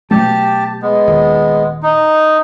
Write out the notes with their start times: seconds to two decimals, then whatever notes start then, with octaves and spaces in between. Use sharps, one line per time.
0.11 B2 F#3 A3 G4 A5
0.82 G#3 B3
1.08 D#1 D#2
1.83 D#4